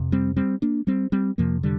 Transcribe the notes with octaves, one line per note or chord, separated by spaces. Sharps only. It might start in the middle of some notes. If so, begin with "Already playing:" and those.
Already playing: F2 C3
G3 C4
G3 C4
A#3 D4
G3 C4
G3 C4
F2 C3 F3 A#3
D3 G3